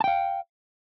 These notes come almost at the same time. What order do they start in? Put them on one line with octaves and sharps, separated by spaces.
A5 G5 F5